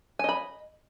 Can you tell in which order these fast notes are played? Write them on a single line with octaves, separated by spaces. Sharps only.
G#5 D#5 B5